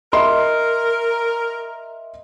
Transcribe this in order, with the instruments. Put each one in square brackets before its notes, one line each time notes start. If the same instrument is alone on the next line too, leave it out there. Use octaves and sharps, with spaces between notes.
[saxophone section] A#4 [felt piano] D#5 E5 C6